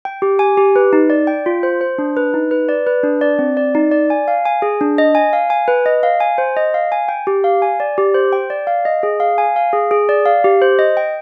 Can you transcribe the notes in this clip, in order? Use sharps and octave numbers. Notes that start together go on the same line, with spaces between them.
G5
G4
G#5
G4
B4
D#4
D5
G5
F4
C5
C5
D4
B4
D#4
B4
D5
B4
D4
D5
C4
D5
D#4
D5
G#5
F5
G#5
G#4
D4
D#5
G#5
F5
G#5
B4
D#5
F5
G#5
C5
D#5
F5
G#5
G5
G4
F5
G#5
D5
G4
C5
G5
D5
F5
D#5
G#4
F5
G#5
F5
G#4
G#4
D5
F5
G4
C5
D#5
G5